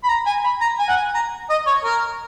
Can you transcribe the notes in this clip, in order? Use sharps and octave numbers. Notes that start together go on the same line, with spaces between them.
B5
A#5
G#5
B5
A#5
G#5
F#5
G#5
A#5
D#5
C#5
A#4